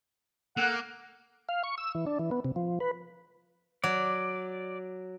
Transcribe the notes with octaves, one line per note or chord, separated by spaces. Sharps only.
A#3 A4 F#5
F5
C#6
E6
E3
D4
E3
B3
C3
F3
B4
F#3 D5